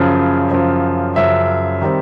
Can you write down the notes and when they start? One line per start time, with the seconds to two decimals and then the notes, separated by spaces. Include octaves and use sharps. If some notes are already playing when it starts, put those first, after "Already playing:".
Already playing: F#2 C#3 F3
0.51 F#2 C#3 F3
1.16 F#2 C#3 F3 E5
1.82 D#3 G3 C4 D#4